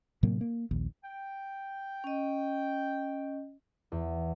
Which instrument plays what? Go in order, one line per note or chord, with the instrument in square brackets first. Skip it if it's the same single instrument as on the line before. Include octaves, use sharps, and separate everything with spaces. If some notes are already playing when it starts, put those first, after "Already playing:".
[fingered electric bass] A2 C3 F#3 A#3
A#3
A#1 D#2
[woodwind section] G5
[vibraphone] C#4 D#5
[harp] E2